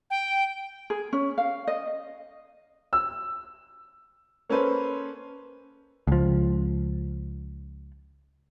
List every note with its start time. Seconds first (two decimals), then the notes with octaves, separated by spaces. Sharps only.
0.10 G5
0.90 G#4
1.13 C#4
1.38 F5
1.67 D#5
2.93 E6
4.49 A#3 C#4 A4 B4 C5
6.07 C#2 F3